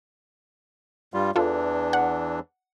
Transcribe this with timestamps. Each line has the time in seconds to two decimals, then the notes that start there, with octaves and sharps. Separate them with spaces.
1.14 G2 G3 F4
1.36 E2 E3 D4 F4 A4
1.93 F#5